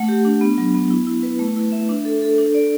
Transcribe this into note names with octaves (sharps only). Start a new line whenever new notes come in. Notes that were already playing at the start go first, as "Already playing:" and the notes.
Already playing: A3 F#5
G4
D4
B3
F#3
B3
E4
E4
B4
A3
E4
E5
D4
A4
A4
D4
D5